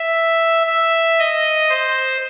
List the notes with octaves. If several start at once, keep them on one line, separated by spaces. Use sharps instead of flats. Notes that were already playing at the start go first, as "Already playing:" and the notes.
Already playing: E5
E5
D#5
C5